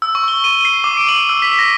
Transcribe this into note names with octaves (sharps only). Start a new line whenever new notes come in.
E6
C#6
G7
D#7
C7
D6
D7
F#7
E6
B6
A#6